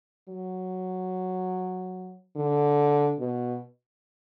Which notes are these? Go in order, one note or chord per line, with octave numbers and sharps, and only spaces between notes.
F#3
D3
B2